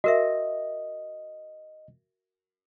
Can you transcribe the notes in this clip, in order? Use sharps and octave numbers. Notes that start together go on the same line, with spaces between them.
F#4 A#4 D#5 E5